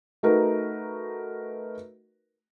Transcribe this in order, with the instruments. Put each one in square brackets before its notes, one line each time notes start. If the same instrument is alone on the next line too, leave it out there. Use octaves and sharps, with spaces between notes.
[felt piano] A3 D#4 F#4 A#4 B4